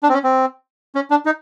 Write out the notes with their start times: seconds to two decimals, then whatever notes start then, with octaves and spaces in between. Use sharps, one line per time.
0.03 D4
0.09 C4
0.14 C#4
0.24 C4
0.95 C#4
1.10 D4
1.26 D#4